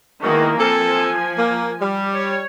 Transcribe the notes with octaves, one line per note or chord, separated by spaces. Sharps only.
D#3 G#3 A#3 B3 E4 F#4
F3 C4 A4 G#5
A#3
G3
C#5